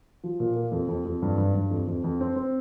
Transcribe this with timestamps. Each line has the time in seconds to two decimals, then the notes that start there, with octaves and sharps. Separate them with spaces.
0.24 F3
0.40 A#2
0.56 A#3
0.72 F2
0.88 F2
1.05 F2
1.22 G2
1.38 G2
1.55 G2
1.71 F2
1.87 F2
2.04 F2
2.21 C4
2.36 C4